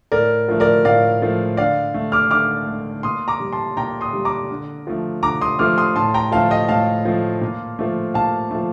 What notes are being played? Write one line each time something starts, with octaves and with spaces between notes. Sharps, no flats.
A2 A#4 D5
F3 A3
A#4 D5
A2 D5 F5
F3 A3
D3 D5 F5
A3
D6 F6
D3 D6 F6
A3
A#2 C6 D#6
A#5 D6
G3
A5 C6
A#2 G5 A#5
C6 D#6
G3
A#5 D6
D3
F3 A3
D3 A#5 D6
C6 D#6
F3 A3 D6 F6
C6 D#6
A2 A5 C6
G5 A#5
F3 A3 F5 A5
D#5 G5
A2 F5 A5
F3 A3
A#2
F3 A3
A#2 F5 A5
F3 A3